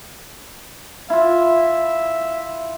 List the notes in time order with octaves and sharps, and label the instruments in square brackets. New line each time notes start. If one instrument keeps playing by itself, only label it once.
[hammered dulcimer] E4 F4 [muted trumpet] E5